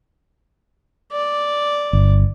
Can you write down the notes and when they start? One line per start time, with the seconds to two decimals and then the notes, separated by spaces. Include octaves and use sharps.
1.12 D5
1.93 G1